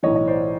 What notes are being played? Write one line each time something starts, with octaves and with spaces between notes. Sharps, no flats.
B1 A2 E3 C#5 D#5
D#5
C5 D5